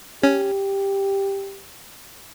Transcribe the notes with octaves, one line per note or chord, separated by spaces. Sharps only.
C#4 G4